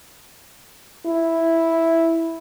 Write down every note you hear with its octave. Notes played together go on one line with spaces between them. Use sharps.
E4